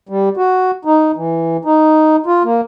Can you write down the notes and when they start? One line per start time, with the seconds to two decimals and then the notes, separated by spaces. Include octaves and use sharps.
0.09 G3
0.37 F#4
0.85 D#4
1.16 E3
1.65 D#4
2.26 F4
2.44 A#3